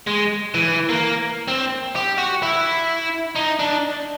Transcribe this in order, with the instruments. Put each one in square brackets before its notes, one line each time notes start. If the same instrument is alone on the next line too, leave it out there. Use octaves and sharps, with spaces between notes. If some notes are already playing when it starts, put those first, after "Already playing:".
[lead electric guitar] G#3
E3
A#3
C4
G4
F#4
E4
D#4
D4